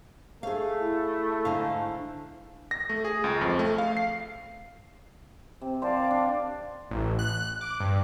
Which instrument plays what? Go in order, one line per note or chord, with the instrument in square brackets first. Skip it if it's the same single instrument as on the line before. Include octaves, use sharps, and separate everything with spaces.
[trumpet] A3 [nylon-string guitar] G#4 F5
[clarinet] E4
[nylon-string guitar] G#2 D3 F5
[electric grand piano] A#6
A3
G#4
C#2
F2
A3
F5
C7
[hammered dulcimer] C3
[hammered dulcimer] C5 A5 [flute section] D5 F5
[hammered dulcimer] D4
[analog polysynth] A1
F#6
D6
G2